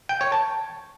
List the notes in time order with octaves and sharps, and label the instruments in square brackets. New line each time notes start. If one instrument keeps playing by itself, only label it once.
[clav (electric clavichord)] G5
C#5
A5